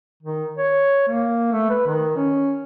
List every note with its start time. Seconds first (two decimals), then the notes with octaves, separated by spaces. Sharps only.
0.23 D#3
0.58 C#5
1.09 A#3
1.52 A3
1.70 B4
1.86 D#3
2.16 C#4